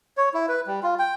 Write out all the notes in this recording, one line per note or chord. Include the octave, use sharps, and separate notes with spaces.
C#5
E4
B4
G3
F4
G5